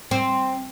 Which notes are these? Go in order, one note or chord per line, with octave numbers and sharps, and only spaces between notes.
C4